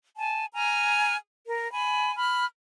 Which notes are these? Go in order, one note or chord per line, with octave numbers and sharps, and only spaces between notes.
G#5 A5
G#5 A#5 F6
A#4
G#5 B5
B5 F6